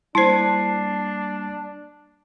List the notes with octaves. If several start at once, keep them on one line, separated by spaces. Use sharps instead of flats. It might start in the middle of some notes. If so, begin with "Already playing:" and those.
G3 A#3 D4 E4 C5 A5 C7